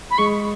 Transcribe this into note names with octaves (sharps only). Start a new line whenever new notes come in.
B5
G#3 C#6